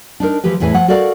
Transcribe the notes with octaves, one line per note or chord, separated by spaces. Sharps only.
D4 D#4 A#4
E3 F3 G#3 G4 B4
E2 A2 E3 G#4 B4 G#5
F3 F#5
F#4 A4 A#4 D5 F5 F#5